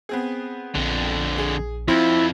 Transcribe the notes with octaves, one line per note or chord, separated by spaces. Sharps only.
B3 C4 G#4
A#1 F2 D3
G#4
F2 C4 E4 F4 C6